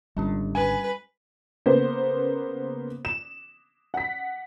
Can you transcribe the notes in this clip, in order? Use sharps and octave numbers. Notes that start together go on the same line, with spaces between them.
G#1 D3 G3 C#4 G4
B4 G#5
C#3 A#3 B3 C5
E7
F#5 B6